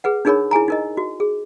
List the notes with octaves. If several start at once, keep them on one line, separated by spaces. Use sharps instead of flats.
G#4 B4 F#5
D4 D#4 G#4 A#4 C#5 B5
E4 G#4 G#5 A#5
D#4 A#4 D#5
F#4
G#4